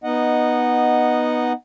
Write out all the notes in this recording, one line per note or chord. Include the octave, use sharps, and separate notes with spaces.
B3 D#4 D#5 F#5